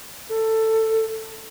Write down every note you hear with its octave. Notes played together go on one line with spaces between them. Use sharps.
A4